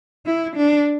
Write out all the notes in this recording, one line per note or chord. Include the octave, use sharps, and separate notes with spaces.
E4
D4